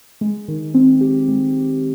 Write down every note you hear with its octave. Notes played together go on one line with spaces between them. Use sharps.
G#3
D#3
C4
G4
G#3